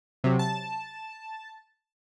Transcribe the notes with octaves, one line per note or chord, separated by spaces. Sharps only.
C3 F#3
A5